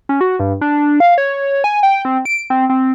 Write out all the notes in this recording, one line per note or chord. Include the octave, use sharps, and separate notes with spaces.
C#4
F#4
G2
D4
F5
C#5
G#5
G5
C4
D7
C4
C4